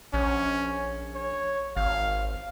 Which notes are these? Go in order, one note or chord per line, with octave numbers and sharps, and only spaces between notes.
A#1 C#4
C#5
G#1 F5